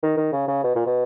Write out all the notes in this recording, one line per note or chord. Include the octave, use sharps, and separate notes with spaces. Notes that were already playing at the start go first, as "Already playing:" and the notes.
D#3
D#3
C#3
C#3
B2
A#2
B2